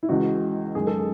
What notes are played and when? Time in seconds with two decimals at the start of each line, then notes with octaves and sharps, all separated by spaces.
0.03 E4
0.09 C#2 C#3 E3 G#3 F#4
0.75 F#1 F#2 D#3 G#3 G#4
0.87 A4
0.98 G#4